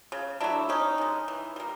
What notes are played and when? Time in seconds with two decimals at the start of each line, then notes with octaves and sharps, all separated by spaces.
0.12 C#3
0.40 F#3 A3 D4 E4
0.69 C3 C#4 D#4
0.98 D#3 G#3
1.28 E3
1.56 G3 A#3